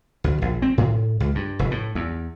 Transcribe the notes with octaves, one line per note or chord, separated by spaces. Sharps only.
D2
A#1
C4
A2
C#2
G2
F1
A2
E2